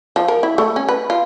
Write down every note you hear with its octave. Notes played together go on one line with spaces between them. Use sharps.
F3
A#4
E4
A3
C#4
B4
F4